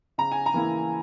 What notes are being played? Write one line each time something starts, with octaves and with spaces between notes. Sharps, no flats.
C#3 A#5
G#5
A#5
E3 A#3 E4